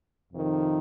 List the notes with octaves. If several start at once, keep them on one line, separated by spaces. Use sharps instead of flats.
F2 C3 D#3